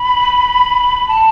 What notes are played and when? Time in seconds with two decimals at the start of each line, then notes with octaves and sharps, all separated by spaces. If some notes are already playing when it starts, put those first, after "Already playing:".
Already playing: B5
1.08 A5